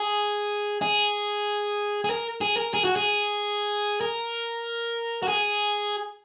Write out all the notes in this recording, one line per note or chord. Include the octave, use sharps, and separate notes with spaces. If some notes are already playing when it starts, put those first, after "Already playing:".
Already playing: G#4
G#4
G#4
A#4
G#4
A#4
G#4
F#4
G#4
A#4
F#4
G#4